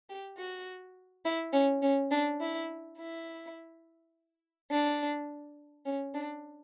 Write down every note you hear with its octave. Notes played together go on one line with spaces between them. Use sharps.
G4
F#4
E4
C#4
C#4
D4
E4
E4
D4
C#4
D4